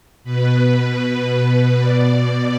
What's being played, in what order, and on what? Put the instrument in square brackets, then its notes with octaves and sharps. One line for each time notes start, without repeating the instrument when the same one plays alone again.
[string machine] B2 B4
D5